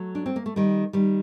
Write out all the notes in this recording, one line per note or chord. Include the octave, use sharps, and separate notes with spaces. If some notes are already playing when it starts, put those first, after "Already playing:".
Already playing: F#3 A3
D4
C4
A#3
A3
D#3 G3
D#3 G3